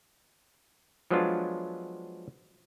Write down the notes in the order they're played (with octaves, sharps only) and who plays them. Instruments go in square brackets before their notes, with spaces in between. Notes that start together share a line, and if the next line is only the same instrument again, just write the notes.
[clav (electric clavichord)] F3 F#3 G#3 B3 D4 F4